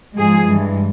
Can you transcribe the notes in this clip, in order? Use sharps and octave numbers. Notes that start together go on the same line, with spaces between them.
G#2 F3 G#3 G#4
G2 E3 G#3